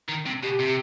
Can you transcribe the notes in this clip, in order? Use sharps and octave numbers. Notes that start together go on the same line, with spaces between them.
D#3
C3
B2 G4
C3